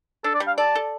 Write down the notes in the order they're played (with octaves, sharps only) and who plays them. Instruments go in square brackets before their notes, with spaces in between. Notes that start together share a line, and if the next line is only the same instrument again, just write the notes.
[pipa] D4 [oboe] A4
[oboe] D5
[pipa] G3
[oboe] F5
[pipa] D5 [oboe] A5
[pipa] A4